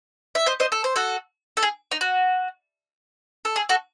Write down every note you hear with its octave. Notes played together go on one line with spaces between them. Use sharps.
E5
C5 D#5
C5 D#5
A4
C5
F#4 A4
A4
G#4
D#4
F#4
A4
G#4
F#4 A4